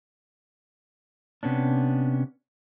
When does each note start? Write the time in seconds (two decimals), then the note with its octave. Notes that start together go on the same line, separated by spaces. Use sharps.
1.43 C3 B3 C#4 D4